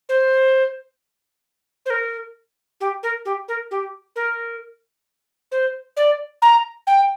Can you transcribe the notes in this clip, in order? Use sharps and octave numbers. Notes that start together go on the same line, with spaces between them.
C5
C5
A#4
G4
A#4
G4
A#4
G4
A#4
C5
D5
A#5
G5